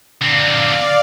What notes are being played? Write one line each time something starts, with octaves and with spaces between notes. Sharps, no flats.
D3 C4 D5 F5